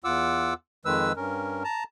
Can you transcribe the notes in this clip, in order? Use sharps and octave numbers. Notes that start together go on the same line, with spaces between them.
E2 F4 F#5 D6 E6
F2 D#3 G#3 B4 E6
G2 C#4 A#4
A5 A#5